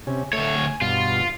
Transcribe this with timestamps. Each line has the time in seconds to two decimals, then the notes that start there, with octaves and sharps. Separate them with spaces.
0.07 C3 C#4
0.33 D2 A3 C#5
0.58 G#5
0.81 G2 B2 F4